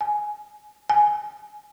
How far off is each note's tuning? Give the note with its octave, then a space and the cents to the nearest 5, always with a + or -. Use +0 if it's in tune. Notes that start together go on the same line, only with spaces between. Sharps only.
G#5 +10
G#5 +5